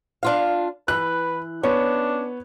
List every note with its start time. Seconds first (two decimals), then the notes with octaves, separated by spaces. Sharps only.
0.23 D4 F4 F5
0.88 E3 B4 F#6
1.63 B3 C#4 D4 C#5